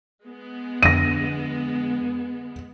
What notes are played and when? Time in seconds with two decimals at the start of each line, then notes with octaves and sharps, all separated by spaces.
0.24 G#3 B3
0.83 F2 D3 A#6 D#7